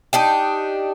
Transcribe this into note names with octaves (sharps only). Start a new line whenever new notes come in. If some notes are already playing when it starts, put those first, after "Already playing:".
D4 D#4 G4